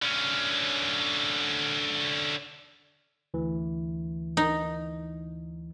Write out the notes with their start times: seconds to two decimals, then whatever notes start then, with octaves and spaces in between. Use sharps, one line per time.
0.02 D3 C#4
3.34 D2 E3
4.37 D#4